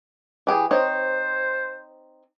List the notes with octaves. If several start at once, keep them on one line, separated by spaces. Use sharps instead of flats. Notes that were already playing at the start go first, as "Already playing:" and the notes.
E3 G4 G#4
C4 D#4 C5 C#5